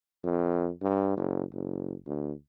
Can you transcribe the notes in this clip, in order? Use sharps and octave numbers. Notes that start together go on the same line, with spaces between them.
F2
G2
F#1
F#1
D2